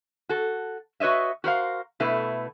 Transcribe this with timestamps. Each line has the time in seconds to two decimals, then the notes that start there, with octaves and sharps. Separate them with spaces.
0.29 F#4 A4
1.00 F#4 B4 C#5 D#5 E5
1.44 F#4 A#4 C5 F5
2.00 B2 A3 E4 B4